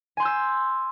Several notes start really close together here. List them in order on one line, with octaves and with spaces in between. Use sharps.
G#5 C6 G6 E6 C7